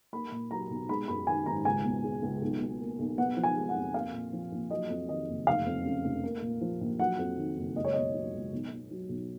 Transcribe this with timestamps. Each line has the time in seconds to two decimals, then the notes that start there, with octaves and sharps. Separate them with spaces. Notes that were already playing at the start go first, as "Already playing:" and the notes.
0.13 A#3 B5
0.32 A#2
0.51 F#3 A#5
0.70 B1
0.89 G#3 B5
1.08 F#2 B5
1.27 D#3 G#5
1.46 G#1 A#5
1.65 C#2 G#5
1.85 B2
2.04 G#3
2.22 C#2
2.42 B1
2.61 B2
2.80 A#3
2.99 B1
3.18 B3 F#5
3.37 F3
3.43 G#5
3.56 G#3
3.69 F#5
3.75 F2
3.94 A#3 F5
4.13 A#2
4.33 F3
4.52 A#1
4.71 F#3 D#5
4.90 F2
5.09 D#3 D#5
5.28 F#1
5.47 F1 F5
5.66 F2
5.85 C#3
6.04 F1
6.24 A#3
6.42 A#2
6.61 F3
6.81 A#1
6.99 F#3 F#5
7.19 F2
7.37 D#3
7.56 F#1
7.76 C#2 D#5
7.85 C#5
7.93 B2 D#5
8.14 F#3
8.33 C#2
8.53 B1
8.71 B2
8.91 F#3
9.09 B1